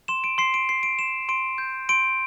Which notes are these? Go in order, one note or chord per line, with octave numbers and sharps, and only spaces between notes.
C6 E7
D7
C6 C7
D7
C6 C7
D7
C6 E7
C6 D7
G6
C6 D7